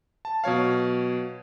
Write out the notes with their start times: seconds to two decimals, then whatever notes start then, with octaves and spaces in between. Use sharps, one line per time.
0.25 A5
0.44 B2 F#3 C#5 F5